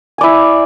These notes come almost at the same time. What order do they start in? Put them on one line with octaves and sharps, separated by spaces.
G#5 D5 E4